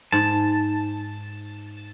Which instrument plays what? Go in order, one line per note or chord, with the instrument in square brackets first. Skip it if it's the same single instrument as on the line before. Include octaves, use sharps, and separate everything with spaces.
[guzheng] G#2 [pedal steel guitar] A5